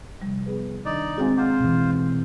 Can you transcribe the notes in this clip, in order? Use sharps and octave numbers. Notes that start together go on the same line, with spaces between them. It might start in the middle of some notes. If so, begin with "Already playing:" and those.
C3 F3 G3
B3 G#4 B4
D#3 D4 D#4 D5
G#3 C4 F#4 F5 G#5
F4 C5 F#5 A#5 D6
B2 E3